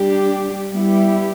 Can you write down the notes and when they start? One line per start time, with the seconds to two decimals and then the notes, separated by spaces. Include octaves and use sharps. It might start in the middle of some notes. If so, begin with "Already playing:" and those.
Already playing: G3 D4 G4
0.72 G3 B3 E4 G4